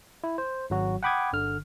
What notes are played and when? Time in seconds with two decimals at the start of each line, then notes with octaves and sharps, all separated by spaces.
0.24 E4
0.38 C5
0.70 G#1 F#3 F#4
1.03 F#5 G5 B5 D6 D#6 G#6
1.33 G1 D3 F6